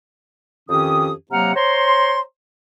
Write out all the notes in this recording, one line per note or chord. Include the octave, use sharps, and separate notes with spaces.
F2 D#3 C#4 G4 D#6
C3 F#3 A#3 F#5 A#5 F6
C5 C#5 A#5 C6